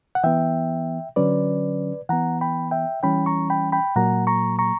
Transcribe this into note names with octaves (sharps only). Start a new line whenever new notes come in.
F#5
E3 B3 E5 G5
D3 F#3 C#4 B4 D5
E3 B3 F#5 A#5
G5 B5
E5 G5
E3 G3 C#4 G5 B5
A#5 C#6
G5 B5
G5 B5
A#2 F#3 A#3 F#5 A#5
A#5 C#6
A#5 C#6